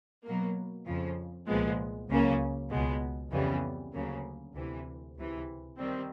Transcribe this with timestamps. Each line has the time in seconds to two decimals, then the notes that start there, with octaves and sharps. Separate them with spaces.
0.25 B2 F#3 A#3
0.86 F2 C#3 F3
1.47 C2 A#2 F3 G#3 B3
2.09 C#2 C#3 F#3 A#3 C#4
2.71 C#2 B2 G#3 B3
3.31 F2 C#3 E3 G3 B3
3.93 D2 C#3 F#3 A#3
4.55 D2 C3 E3
5.15 C#2 C3 E3
5.78 D#3 G3 C4